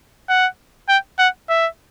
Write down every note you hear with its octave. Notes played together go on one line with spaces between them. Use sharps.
F#5
G5
F#5
E5